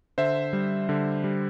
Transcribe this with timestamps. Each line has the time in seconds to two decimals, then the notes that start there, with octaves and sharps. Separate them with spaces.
0.18 D3 C5 E5
0.53 G3
0.89 D3
1.24 G3